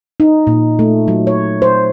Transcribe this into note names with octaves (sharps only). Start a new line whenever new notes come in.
D#4
A#2
A3
F#3
C#5
C5